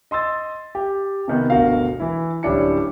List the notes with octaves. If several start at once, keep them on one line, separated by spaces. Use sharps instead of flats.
D#5 C6 E6 A6
G4
C3 D#3 B3
G1 D2 B2 F#4 A#4 F5
E3 E4
D1 G3 C#4 D4 E4 C#7